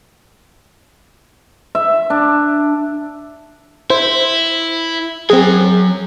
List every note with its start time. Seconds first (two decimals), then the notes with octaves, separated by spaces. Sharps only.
1.75 E5
2.10 D4
3.90 E4 C5
5.30 F#3 C4 G#4 G#5